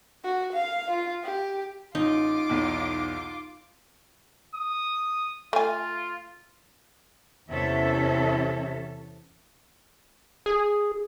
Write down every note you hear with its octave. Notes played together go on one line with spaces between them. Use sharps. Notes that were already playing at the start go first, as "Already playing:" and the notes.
F#4
F5
F4
G4
A1 D#4 F4 D6
B1 E2
D#6
A3 F4 G#5
E2 C3 C#4 A4 E5
G#4